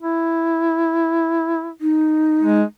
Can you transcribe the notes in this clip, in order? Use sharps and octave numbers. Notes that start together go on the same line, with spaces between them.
E4
D#4
G#3